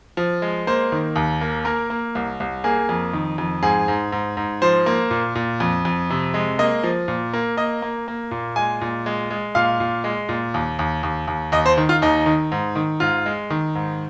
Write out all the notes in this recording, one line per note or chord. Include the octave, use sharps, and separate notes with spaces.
F3
G#3
A#3 C5
D#3
D#2
A#3
A#3 A#4
A#3
C2
C2
A#3 G#4
F2
D#3
F2
G#2 G#4
G#2
G#2
G#2
F3 C5
A#3
A#2
A#2
F2
F2
C3
G#3
A#3 D#5
F3
A#2
A#3
A#3 D#5
A#3
A#3
A#2
G#3 G#5
A#2
G#3
G#3
A#2 F5
A#2
G#3
A#2
D#2
D#2
D#2
D#2
D#2 D#5
C5
D#3
F4
D#2 D#4
D#3
G#2
D#3
G#2 F4
G#3
D#3
G#2